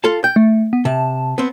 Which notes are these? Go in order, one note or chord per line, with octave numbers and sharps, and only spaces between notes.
F4 A4 A5
G5 G6
A3
B3
C3 A5
B3 C4